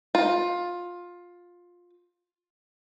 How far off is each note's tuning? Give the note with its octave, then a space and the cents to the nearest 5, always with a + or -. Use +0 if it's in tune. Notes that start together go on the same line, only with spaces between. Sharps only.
F4 +15